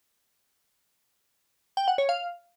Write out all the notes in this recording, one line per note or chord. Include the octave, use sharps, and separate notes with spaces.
G5
F#5
C#5
F5